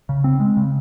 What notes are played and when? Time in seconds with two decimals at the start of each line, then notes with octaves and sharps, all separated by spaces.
0.09 C#3
0.24 C4
0.40 G#3
0.57 C#3